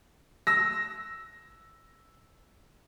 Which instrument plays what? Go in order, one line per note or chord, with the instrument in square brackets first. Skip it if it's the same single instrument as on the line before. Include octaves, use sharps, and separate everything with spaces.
[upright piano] E6 A#6